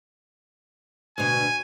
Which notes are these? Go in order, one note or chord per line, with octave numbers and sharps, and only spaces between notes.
D2 B2 G#5